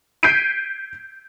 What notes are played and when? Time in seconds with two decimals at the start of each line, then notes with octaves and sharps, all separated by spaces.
0.23 G6 G#6 B6 C7 D7 D#7